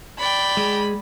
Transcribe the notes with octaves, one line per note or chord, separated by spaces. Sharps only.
D5 G5 B5
G#3